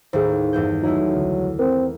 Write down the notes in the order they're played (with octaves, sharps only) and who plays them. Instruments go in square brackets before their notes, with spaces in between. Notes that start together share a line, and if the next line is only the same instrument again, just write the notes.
[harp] D#2 A2 [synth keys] G#4 C5
[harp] E2 G2 G6
[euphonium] F#3 [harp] A3 E4 G#4 [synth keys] D#4
[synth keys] C#2 D3
[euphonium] C4 [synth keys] A#4